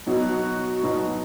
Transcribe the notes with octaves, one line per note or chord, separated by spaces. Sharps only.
B2 F#3 B3 D#4 F#4
B2 F#3 B3 D#4